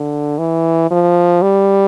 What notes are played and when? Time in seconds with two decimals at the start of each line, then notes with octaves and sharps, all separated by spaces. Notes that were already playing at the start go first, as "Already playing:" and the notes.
Already playing: D3
0.38 E3
0.90 F3
1.42 G3